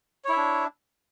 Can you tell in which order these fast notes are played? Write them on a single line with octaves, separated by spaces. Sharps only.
C#5 E4 E5 D4